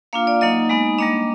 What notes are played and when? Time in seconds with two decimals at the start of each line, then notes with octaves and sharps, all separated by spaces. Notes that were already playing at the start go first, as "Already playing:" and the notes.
0.13 A#3 D4 F4 F5
0.27 D5
0.41 F#3 A#3 D#4 D#5
0.69 G#3 B3 D#4
0.98 G3 A#3 D4 D#5